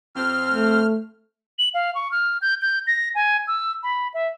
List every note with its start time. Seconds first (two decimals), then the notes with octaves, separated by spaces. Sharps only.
0.16 F2 C4 F6
0.52 A3
1.59 F#7
1.74 F5
1.95 C#6
2.11 F6
2.42 G6
2.62 G6
2.87 A#6
3.15 G#5
3.48 E6
3.83 B5
4.14 E5